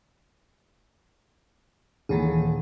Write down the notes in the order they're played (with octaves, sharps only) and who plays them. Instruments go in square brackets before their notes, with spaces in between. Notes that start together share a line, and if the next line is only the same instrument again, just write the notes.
[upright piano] D#1 [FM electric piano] D#3 E3 G#4